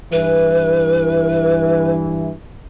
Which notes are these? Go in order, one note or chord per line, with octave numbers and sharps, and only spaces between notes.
G2 E3 B4